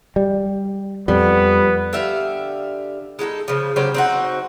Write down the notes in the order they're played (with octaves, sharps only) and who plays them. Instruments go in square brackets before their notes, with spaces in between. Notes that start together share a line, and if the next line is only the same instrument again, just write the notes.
[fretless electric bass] G3
[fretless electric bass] F2 [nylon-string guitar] G3 [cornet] B3
[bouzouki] D3 G4 E5 F5
G#3 D#4 F#4 A4
C#3 F3
C#3 F#3 G4 C5
C4 D#4 F#4